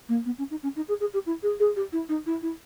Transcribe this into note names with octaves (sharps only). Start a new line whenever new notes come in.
A#3
B3
C#4
D#4
C#4
D#4
G#4
G#4
G4
E4
G#4
G#4
G4
E4
D#4
E4
E4